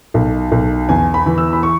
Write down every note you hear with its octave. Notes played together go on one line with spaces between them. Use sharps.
B1
B1
E2 G#5
B5
E3
E6
B5
C#6